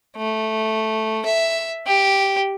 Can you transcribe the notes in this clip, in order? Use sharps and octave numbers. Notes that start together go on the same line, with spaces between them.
A3
E5
G4